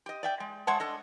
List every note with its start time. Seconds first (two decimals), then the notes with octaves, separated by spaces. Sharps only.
0.06 G4 D#5
0.23 D5 E5 G5
0.40 G#3
0.67 G#3 C#5 E5 F#5 A5
0.80 D4 A4 D#5